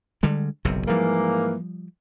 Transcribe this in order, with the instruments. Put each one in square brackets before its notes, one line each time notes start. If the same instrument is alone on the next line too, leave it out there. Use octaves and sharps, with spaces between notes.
[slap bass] D3 G3 G#3
F#1 B1 C3
[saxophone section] G#2 E3 A#3 [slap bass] F3 G3